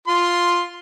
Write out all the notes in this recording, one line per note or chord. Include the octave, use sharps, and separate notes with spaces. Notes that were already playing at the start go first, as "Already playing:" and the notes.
F4 C6